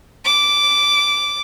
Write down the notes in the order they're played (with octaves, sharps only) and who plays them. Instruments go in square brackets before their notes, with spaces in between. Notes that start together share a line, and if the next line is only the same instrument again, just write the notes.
[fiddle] D6